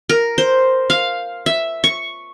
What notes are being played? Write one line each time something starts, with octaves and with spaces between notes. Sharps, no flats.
A#4
C5
F5
E5
C#6